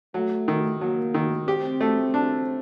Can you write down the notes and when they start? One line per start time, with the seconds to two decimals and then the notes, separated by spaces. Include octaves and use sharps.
0.14 F#3 A3
0.48 D#3
0.81 F#3 A#3
1.14 D#3
1.48 C4 G4
1.81 A3
2.14 D4